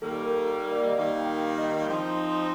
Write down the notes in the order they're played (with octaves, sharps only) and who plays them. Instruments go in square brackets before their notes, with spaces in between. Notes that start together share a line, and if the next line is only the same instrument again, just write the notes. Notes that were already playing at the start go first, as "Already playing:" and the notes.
[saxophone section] D#3 G3 A#3 [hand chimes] A4
[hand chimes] A#4
A#4
D5
D#5
[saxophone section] D#3 G3 A#3 [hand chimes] F5
[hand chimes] G5
F5
D#5
[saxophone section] F3 C4 D#4